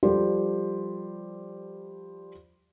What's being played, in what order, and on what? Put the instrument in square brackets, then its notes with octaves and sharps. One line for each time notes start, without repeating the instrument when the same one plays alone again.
[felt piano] F3 G3 G4 A4 C5 D5